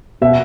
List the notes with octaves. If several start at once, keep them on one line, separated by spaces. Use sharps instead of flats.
B2 E5